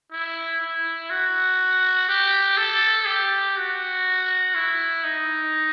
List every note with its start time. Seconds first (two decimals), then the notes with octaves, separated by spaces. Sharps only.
0.12 E4
0.61 E4
1.10 F#4
2.09 G4
2.57 A4
3.07 G4
3.57 F#4
4.55 E4
5.04 D#4